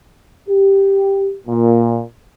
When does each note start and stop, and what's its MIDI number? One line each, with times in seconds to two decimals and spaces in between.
0.49 1.35 67
1.47 2.02 46